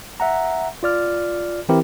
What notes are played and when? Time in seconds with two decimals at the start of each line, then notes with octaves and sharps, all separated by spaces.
0.20 E5 F#5 A#5
0.83 F4 D5 F6
1.69 E3 C4 E4 G4 A#4